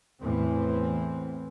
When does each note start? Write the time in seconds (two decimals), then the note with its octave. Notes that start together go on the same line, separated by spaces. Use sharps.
0.21 E2 A2 E3 C4